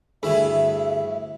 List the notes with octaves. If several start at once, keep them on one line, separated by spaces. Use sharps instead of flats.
D2 G2 E4 G#4 E5